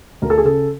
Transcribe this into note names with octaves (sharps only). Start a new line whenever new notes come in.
D2 A#4
A4
G#4
C#3 A4